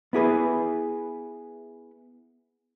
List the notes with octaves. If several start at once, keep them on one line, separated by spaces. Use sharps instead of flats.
B3 E4 G#4 B4